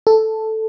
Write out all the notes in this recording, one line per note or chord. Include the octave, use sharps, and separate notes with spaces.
A4